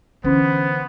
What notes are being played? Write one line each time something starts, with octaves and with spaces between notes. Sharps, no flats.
D3 E3 B3 C#4 C5